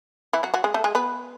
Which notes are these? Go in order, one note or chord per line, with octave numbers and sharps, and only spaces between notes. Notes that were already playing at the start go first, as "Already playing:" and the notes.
E3 E4
F#3 F#4
F#3 F#4
G#3 G#4
A3 A4
G#3 G#4
B3 B4